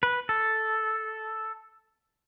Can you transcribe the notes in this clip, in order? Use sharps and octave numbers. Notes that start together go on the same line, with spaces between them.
B4
A4